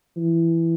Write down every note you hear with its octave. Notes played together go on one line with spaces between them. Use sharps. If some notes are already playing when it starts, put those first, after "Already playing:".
E3